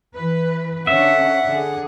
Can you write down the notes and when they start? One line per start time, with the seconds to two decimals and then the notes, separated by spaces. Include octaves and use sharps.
0.16 E3 B4
0.87 D3 C#4 D4 E5 F#5
1.47 D3 D4 G#4